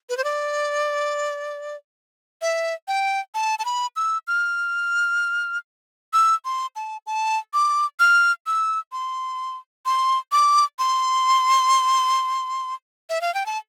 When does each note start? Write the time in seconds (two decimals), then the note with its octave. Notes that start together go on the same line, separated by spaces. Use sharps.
0.09 B4
0.17 C5
0.24 D5
2.42 E5
2.88 G5
3.35 A5
3.59 A5
3.65 B5
3.96 E6
4.27 F6
6.13 E6
6.45 C6
6.76 A5
7.07 A5
7.54 D6
8.00 F6
8.46 E6
8.92 C6
9.86 C6
10.32 D6
10.79 C6
13.10 E5
13.21 F5
13.34 G5
13.46 A5